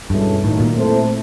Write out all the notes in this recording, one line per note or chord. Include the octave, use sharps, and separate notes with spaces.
G2 B2 G#3 C#4 E4 A4
A2 D#3 F#3 A#3 D#4
A#2
A3 C4 E4 A4 C5